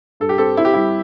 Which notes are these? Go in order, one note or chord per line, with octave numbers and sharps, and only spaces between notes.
G2 A4
G4
C4 A4
C4 E4
G4
G3 E4